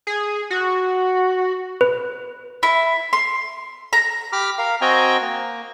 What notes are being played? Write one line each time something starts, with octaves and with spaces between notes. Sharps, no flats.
G#4
F#4
B4
E4
C6
A#5
G4 B5 D6 F6
A#4 F5
C4 F#4 D#5 G5 G#5 A#5
A#3